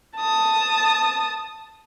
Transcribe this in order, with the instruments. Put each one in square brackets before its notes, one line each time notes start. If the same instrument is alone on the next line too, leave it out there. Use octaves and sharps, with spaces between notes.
[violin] A5 D#6